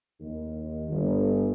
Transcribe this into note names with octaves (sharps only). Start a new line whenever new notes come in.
D#2
G1